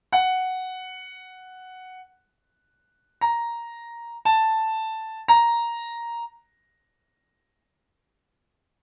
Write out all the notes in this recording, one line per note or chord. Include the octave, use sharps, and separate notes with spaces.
F#5
A#5
A5
A#5